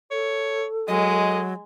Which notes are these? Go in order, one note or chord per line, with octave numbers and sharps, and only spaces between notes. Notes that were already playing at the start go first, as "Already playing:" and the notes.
A4 C#5
F#3 G#3 D#5